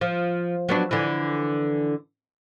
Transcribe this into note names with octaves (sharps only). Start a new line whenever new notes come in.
F3
F#3 B3 D4
D3 E3